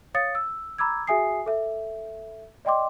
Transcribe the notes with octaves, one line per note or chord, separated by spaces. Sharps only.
C#5 F5 D#6 A6 C#7
E6
A#5 B5 D6 E6 G#6
F#4 G#4 E5 G#5 D#6 C7
A4 E5
D5 D#5 G5 C6 D6